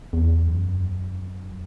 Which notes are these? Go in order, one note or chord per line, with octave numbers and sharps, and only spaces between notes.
E2
F#2